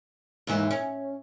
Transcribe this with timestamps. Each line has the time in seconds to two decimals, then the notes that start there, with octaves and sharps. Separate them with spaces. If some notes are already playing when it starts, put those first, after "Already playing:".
0.47 D#2 G#2 E3
0.71 C#4